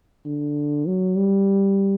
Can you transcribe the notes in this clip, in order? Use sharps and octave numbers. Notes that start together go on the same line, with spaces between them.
D3
F#3
G3